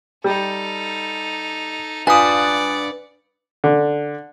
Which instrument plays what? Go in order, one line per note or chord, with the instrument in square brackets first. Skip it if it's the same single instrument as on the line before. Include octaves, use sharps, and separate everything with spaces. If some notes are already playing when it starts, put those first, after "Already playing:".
[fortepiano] G3 [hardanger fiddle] D#4 A4
[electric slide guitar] D4 B4 [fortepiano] F4 [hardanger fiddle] D5 F#5 [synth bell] G#5 D#6
[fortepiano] D3